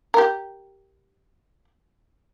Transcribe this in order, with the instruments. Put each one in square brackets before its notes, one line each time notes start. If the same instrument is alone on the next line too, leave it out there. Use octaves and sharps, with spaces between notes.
[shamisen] G4 A#4